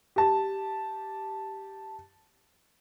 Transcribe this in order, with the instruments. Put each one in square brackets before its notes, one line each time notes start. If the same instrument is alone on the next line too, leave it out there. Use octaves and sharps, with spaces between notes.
[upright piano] G4 A5